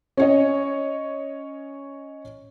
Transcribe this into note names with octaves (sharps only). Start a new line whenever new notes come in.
C#4 C#5 D#5